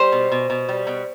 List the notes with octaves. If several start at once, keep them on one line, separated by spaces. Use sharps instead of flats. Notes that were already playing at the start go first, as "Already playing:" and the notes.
Already playing: G3 C5
B2
B2
B2
G3
B2